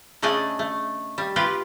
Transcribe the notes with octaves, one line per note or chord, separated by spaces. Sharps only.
C#3 A3 D4 D#5 G#5
A3
G3
F4 G4 B4